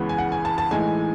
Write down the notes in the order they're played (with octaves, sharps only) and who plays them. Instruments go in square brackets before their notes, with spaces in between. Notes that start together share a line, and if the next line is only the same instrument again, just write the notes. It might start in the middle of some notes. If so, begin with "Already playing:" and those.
Already playing: [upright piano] C#2 C#3 E3 B3
G#5
F#5
G#5
A5
A5
A2 E3 G#3 D#4 G#5